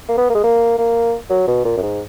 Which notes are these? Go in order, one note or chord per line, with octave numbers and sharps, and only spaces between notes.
A#3
B3
A#3
G#3
A#3
A#3
F#3
B2
A#2
F#2
G#2